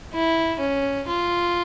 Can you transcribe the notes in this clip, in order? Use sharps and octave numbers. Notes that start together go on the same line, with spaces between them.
E4
C#4
F4